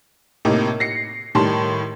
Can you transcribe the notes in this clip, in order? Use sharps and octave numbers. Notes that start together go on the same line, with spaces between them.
A2 C3 A#3 D#4
A#6 C7 C#7
A2 D#3 G3 A5 C6